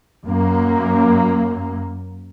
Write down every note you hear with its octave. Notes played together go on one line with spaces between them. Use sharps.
F#2 A#3